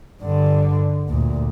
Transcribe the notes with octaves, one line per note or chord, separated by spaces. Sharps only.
G2 D3
D2 A#2